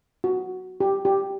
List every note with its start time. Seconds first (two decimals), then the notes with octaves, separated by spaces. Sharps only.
0.24 F#4
0.80 G4
1.05 G4